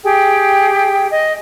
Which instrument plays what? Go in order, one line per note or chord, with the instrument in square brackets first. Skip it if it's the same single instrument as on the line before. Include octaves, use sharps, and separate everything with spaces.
[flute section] G4 G#4 G5
D#5